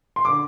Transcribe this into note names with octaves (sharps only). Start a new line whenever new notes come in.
C6
D3 D6